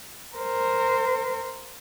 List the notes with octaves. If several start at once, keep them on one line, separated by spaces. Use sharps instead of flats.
A#4 C5